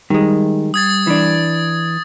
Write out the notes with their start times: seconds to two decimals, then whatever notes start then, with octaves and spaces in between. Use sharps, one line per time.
0.10 D#3 G3 G#3
0.74 D#6 G#6 A6
1.07 E3 D4